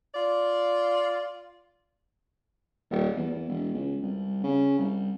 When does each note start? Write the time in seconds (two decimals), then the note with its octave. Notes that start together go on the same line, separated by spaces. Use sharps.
0.15 F4 D5
2.91 D#1
3.16 E2
3.31 E2
3.49 E1
3.74 C#2
4.02 C2
4.44 C#3
4.79 C2